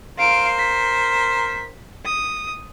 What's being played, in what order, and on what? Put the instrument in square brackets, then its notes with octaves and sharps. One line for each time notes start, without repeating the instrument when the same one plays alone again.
[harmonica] A#4 C5 [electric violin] F5 D7
[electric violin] B6
D#6